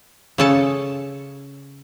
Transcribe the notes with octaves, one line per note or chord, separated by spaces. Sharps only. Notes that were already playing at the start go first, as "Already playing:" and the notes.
C#3 G#4 A4 C#5 A5